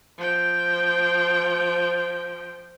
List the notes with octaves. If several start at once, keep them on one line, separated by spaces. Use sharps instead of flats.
F3 G5